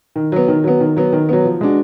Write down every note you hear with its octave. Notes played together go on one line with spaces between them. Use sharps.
D#3
F#3 B3
D#3
F#3 B3
D#3
F#3 B3
D#3
F#3 B3
F3
G#3 D4 F#4